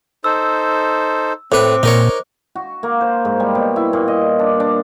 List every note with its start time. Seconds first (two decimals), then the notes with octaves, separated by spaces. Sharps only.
0.24 D#4 A4 C5 E6
1.52 A2 C4 B4 C5 D6
1.83 A#2 D#4 A#4 C#5
2.55 F#4
2.83 A#3
3.01 C5
3.25 G#2
3.40 G3
3.55 B2
3.76 E4
3.93 A#2
4.08 D#5
4.39 D4
4.60 D4